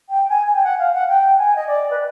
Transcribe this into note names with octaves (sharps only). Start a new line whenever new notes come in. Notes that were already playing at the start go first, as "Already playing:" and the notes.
G5
G#5
G#5
G5
F#5
F5
F#5
G5
G#5
D#5
D5
B4